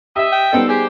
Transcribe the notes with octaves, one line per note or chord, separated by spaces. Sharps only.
G4 D#5 E5
G5
G3 B3 C4 D#4 A4
G4 G#4 C5